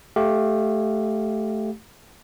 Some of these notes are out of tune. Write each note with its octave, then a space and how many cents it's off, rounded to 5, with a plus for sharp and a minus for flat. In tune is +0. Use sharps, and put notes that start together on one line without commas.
A3 -15 G4 +0 F5 +0